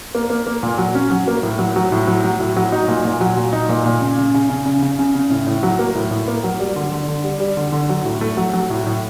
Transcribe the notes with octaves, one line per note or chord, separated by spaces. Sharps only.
A#3
A#3
A#3
A#2
F#3
C#4
F#3
A#3
A2
F#3
F#3
A2
F#3
F#3
A2
F#3
D#4
A#2
A#2
F#3
A#2
D#4
A#2
A#2
C#3
C#3
C#3
C#3
C#3
C#3
C#3
C#3
A2
A2
F#3
A#3
A2
A2
A#3
F#3
G3
D3
D3
D3
G3
G3
D3
D3
F#3
A2
A3
F#3
F#3
A2
A2